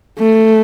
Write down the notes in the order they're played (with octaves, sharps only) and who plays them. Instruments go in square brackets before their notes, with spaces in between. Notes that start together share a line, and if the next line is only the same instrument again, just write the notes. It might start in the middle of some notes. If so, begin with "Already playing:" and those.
[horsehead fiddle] A3